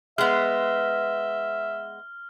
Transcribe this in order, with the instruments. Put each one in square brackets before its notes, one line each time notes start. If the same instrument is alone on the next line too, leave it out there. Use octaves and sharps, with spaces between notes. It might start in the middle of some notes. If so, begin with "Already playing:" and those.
[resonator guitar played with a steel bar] G#3 B3 [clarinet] E5 [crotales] F6